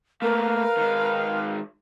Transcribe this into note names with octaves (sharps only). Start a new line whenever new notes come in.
A3 A#3 A#4 B4 F5
D#3 G#3